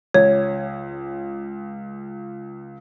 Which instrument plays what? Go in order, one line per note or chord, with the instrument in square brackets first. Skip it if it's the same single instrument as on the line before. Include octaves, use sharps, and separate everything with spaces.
[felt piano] C#2 [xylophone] C#5